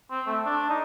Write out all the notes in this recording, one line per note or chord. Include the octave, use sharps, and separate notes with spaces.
C4
A3
D4
D#4